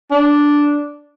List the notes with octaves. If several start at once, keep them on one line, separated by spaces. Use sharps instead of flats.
D4